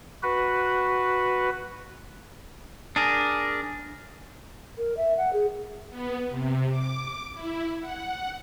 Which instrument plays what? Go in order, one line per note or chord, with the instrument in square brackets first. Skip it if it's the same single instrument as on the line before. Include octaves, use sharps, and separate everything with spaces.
[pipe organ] F#4 B4
[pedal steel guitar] D4 G#4 A#4
[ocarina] A#4
E5
F#5
G#4
[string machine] B3
C3
D6
E4
F#5